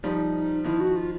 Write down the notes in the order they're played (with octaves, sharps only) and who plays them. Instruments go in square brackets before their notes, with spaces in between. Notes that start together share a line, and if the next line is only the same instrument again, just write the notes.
[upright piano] F3 G3 [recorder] D#4
[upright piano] D#3 F3 [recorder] E4
[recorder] F#4
F4